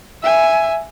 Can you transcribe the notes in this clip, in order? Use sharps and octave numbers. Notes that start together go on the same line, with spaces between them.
E5 G#5